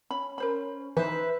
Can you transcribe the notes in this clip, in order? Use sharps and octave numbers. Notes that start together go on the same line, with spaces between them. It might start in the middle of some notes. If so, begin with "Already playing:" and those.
C#4 B5
A#4 C5 B5
E3 D#4 B4 C5 E5